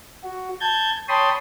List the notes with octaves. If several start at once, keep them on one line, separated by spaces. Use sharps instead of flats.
F#4
A5 G6 G#6
C#5 G5 A5 B5 C6 D#6